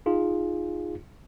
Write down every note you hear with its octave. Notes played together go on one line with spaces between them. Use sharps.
D#4 F4 G#4